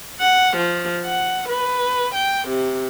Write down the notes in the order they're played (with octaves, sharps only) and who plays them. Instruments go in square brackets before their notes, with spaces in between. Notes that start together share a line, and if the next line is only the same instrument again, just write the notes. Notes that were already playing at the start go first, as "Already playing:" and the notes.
[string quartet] F#5
F3
F#5
B4
G5
C3